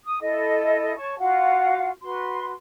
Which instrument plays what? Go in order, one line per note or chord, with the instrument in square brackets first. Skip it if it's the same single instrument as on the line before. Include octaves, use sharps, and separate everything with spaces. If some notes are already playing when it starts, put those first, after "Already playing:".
[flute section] D#6
E4 A4 D#5
C#5 A5 C#6
F4 F#4 F5 F#5
F#4 B4 C6